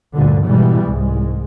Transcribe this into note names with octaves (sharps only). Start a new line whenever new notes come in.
D2 G2 A#2 D3
G#2 B2 E3 G3 G#3
C2 G#2 G#3